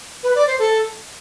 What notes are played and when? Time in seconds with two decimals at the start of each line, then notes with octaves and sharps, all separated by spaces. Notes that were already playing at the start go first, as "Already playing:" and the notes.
0.23 B4
0.35 D5
0.47 C5
0.59 A4